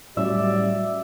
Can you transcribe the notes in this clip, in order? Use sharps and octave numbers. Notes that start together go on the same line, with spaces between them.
A2 F#3 G3 C#4 F#4 D5 E5